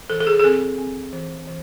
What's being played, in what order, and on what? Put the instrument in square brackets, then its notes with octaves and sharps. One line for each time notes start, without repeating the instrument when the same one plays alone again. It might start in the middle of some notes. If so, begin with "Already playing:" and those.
[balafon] E3 A4
A4
G#4
G#4
C4 A4
C4
E3
E3